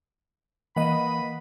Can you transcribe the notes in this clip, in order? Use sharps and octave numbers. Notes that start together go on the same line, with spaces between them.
E3 A#3 D#5 F#5 B5